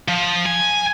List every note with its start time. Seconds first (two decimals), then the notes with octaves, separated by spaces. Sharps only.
0.08 F3
0.46 G#5